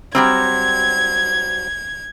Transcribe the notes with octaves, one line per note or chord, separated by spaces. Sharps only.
F#3 G3 C4 G#6